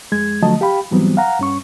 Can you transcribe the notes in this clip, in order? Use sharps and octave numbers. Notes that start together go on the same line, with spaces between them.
F2 G#3 G#6
D3 F3 F#3 A3 D#5 A5
G4 F5 G5 B5
G#2 E3 F#3 G3 B3 C4
F5 F#5 A#5
G2 C#4 C#6